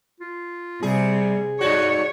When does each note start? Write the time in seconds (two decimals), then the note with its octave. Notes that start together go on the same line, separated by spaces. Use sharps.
0.20 F4
0.83 C3 G3 G#4
1.61 G2 F#4 C#5 D5